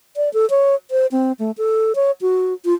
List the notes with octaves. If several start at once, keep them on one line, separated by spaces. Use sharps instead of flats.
D5
A4
C#5
C5
C4
A3
A4
C#5
F#4
F4